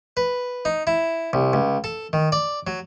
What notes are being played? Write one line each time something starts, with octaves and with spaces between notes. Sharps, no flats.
B4
D#4
E4
C2
C#2
A4
D#3
D5
F#3